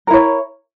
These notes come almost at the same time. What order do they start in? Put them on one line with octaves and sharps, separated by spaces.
A#4 E4 C#5